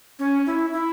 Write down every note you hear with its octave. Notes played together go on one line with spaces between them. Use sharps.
C#4
E4
E4